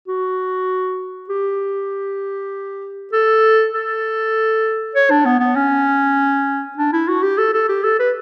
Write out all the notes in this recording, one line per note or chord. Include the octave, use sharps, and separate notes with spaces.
F#4
G4
A4
A4
C#5
D4
B3
B3
C#4
D4
E4
F#4
G4
A4
A4
G4
A4
B4